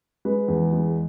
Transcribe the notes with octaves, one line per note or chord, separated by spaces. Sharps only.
G#3 B4
E2
G#3